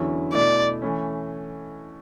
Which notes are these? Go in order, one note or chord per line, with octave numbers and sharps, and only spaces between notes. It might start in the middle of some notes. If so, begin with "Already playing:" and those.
Already playing: E2 D3 F#3 C#4 E4
B2 A3 E4 D5
E3 A3 C#4